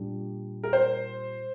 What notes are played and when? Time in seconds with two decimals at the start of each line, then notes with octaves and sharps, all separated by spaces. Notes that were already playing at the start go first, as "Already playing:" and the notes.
Already playing: A#2 G3 D4 G4
0.63 A#4
0.73 C5